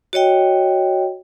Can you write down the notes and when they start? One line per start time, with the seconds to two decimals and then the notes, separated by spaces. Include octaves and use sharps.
0.13 F#4 C#5 D#5 G5